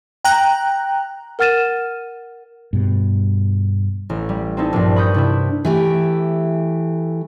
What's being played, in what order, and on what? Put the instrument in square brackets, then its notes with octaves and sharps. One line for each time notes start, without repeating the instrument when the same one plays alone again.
[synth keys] G5 A#5 F#6
[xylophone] A#4 F#5 F6 A6 D#7 E7
[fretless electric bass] G2 B2
[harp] A1
G3
C4 D#4 E4 A4
A#1 G2
B5 C#6 D#6 G6
C3 D4 E4
[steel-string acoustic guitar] E3 A3 G4